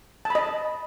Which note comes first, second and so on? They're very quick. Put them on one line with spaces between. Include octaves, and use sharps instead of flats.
A5 B5 D#5